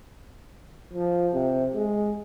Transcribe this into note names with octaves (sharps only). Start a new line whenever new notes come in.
F3
C3
G#3